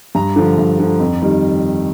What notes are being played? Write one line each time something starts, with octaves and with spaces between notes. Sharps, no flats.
G2 A#5
D3 F3
G2
D3 F3
F2
D#3 G3